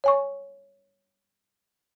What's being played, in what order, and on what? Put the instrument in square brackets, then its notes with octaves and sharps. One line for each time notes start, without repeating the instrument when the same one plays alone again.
[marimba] C#5 G#5 C#6